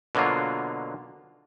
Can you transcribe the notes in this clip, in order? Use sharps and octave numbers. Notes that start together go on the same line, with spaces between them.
B2 D3 F#3 A#3 F4